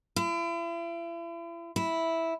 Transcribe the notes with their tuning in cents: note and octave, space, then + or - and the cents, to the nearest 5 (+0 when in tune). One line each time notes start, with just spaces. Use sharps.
E4 +40
E4 -5